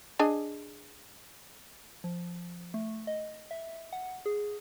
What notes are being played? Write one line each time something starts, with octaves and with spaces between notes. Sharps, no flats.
D4 G#4 D#5
F3
A3
D#5
E5
F#5
G#4